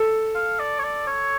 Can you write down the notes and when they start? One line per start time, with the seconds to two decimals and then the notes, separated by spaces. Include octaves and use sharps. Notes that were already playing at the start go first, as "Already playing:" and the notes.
Already playing: A4
0.35 F5
0.59 D5
0.79 C#5
0.83 D5
1.07 C#5